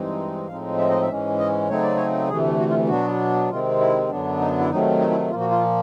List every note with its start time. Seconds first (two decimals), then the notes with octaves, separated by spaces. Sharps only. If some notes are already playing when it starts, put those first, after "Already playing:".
Already playing: G2 E3 G#3 C4 D#4
0.48 A2 F3 G#3 C4 D#4 F5
0.78 E5
0.90 D#5
1.01 E5
1.09 G#2 E3 G#3 C#4
1.39 D#5
1.69 C#3 F#3 A3 C4 D#4 C#5
1.83 D5
1.96 C#5
2.28 D2 C3 E3 A3 G#4
2.59 F#4
2.70 F4
2.89 B2 F#3 B3 D4 F#4
3.50 C3 D#3 G#3 C4 F4
3.80 E4
4.10 F#2 D3 F#3 B3 D4
4.40 D#4
4.59 E4
4.70 C3 D#3 F#3 A3 D#4
5.00 D#4
5.11 E4
5.30 A#2 F3 A#3 F4
5.40 F#4
5.51 F4